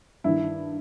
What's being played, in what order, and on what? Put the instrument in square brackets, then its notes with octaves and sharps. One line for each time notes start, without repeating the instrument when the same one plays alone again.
[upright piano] G2 D#3 E4